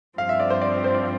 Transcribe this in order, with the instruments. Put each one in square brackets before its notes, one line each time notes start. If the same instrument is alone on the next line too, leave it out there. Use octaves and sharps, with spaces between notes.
[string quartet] G2 F3 C4 [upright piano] F5
[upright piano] E5
D5
C5
D5
C5
D5